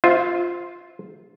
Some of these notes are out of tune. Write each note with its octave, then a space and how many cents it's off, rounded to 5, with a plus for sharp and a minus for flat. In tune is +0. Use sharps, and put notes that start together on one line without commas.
F4 +0 C5 +0 E5 -30